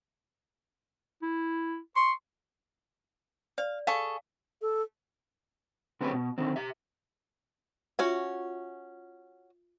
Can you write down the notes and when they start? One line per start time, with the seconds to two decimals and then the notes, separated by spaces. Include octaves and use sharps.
1.22 E4
1.96 C6 C#6
3.58 D5 F5
3.87 G#4 A4 F5 C#6
4.61 A4
6.01 D3 G#3 C4 C#4 G4 B4
6.13 B2
6.38 D3 D#3 C4
6.56 G4 E5
7.99 C#4 F4 F#4 E5 G#5